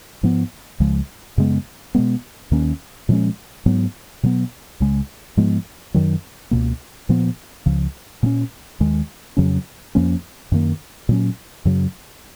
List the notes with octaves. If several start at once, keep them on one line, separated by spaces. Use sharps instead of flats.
G#2 F3 B3
C#2 C#3 F3 G#3
F#2 C#3 G#3 B3
B2 G#3 B3
D#2 D#3 A#3 C#4
A#2 F3 G#3 C#4
G#2 F#3 B3
B2 F#3 B3
C#2 C#3 G#3
G#2 F3 G#3 B3
F#2 D#3 F#3
C#2 B2 A#3
A#2 F3 B3
C#2 C#3 F3
A#2 G#3 C#4
D#2 D#3 G#3
F2 C#3 F#3 C#4
F2 F3 A#3 C#4
F#2 D#3 A#3
A#2 F#3 C#4
F#2 C#3 F#3